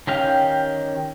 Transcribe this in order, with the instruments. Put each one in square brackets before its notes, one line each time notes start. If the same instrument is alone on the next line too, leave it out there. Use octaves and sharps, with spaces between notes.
[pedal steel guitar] D#3 C#4 G4 F5